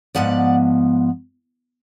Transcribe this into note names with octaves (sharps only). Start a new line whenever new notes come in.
G#2 F3 B3 D5 F#5